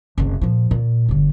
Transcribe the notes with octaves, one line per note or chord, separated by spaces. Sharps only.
F#1 C2
A#2 F3
A#2
G1 D3